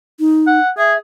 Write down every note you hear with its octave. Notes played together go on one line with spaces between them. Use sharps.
D#4
F#5
G#4 E5